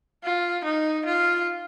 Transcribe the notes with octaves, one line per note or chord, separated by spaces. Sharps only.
F4
D#4
F4